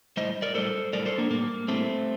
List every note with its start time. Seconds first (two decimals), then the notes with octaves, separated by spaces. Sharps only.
0.17 A2 G3 C5 D#5
0.42 A#4 D5
0.55 A2 G3 A4 C5
0.93 A2 G3 A#4 D5
1.06 A4 C5
1.18 A#3 D4
1.30 A2 G3 A#3
1.68 A2 G3 A3 C4